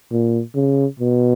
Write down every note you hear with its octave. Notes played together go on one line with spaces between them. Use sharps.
A#2
C#3
B2